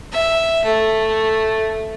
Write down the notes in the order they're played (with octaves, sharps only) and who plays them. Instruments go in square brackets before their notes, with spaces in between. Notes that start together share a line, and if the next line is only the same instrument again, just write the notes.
[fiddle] E5
A3